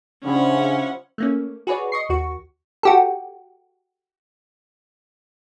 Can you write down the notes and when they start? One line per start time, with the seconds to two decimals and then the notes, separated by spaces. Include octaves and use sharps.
0.24 C#3 F3 G3 C#4 D4 E4 F#5
1.18 A3 A#3 C#4
1.67 F#4 G#4 B4 C#5 D5
1.92 D#5 C#6 C7
2.09 D#2 F#4 C#6
2.83 F#4 G4 A4